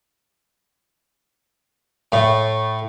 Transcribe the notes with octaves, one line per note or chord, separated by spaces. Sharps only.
A2